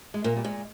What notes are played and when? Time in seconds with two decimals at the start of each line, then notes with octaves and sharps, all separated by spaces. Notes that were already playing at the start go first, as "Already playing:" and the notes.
0.14 G#3
0.24 A#2 A#3
0.37 G3
0.44 A#2 G#3